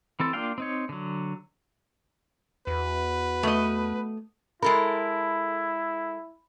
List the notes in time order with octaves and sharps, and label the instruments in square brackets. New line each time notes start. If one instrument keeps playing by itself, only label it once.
[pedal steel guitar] E3 C4 A4
A#3 D4 F4 F5 G5
C4 D#4 C#5
D3 F#3
[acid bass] E2 [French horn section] B3 F#4 [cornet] B4
[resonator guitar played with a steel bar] A3 D#5
[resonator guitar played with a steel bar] G#3 A4 A#4 [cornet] E4 [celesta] B5